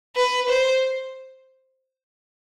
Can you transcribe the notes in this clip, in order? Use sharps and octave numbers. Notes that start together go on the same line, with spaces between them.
B4
C5